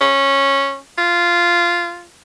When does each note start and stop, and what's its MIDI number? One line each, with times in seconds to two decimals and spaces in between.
0.01 0.78 61
0.98 2.06 65